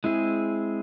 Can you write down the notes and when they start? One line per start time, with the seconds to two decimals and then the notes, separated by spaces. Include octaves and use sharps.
0.04 G#3 C4 E4 G#4